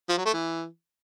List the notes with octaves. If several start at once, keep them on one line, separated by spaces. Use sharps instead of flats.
F3
F#3
A3
E3